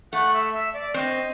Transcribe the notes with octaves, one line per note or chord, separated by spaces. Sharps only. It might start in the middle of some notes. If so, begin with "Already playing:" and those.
A3 F#5
E5
E5
D5
C4 D#5